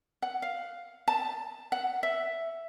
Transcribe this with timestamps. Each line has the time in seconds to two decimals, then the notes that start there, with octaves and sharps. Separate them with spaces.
0.22 F#5
0.42 F5
1.08 A5
1.72 F#5
2.03 E5